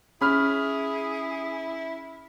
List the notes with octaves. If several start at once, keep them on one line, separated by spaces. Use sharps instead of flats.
C#4 E4 G#4 B5 F6